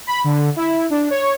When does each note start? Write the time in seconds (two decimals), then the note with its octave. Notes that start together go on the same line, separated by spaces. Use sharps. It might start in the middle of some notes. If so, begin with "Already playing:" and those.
0.07 B5
0.24 D3
0.56 E4
0.90 D4
1.10 C#5